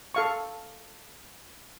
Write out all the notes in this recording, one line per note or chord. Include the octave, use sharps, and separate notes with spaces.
A4 F5 C#6